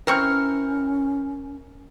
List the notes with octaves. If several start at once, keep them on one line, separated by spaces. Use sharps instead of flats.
E3 C4 C#4 A#4 C#6 F6